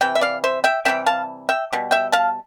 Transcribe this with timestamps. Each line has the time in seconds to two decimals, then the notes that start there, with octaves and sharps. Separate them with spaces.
0.01 C3 E3 G5
0.15 E5
0.21 D5 F5
0.44 C5 E5
0.64 E5 G5
0.85 C3 E3 G3 E5 G5
1.06 F5 A5
1.49 E5 G5
1.73 B2 G3
1.91 E5 G5
2.12 F5 A5